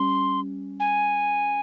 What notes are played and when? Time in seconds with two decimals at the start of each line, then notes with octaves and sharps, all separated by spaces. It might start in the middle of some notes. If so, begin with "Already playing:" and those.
Already playing: G3 C#4 C6
0.80 G#5